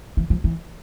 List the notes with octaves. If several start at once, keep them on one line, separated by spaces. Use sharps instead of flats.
E3
F3
E3